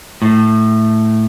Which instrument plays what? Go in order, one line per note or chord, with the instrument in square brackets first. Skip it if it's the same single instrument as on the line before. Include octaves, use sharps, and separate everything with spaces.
[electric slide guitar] A2